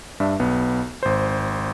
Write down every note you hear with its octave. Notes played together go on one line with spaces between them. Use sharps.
G2 D4 E5
B1 B3
G#1 C5